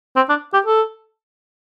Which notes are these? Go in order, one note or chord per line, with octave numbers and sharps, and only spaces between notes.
C4
D4
G4
A4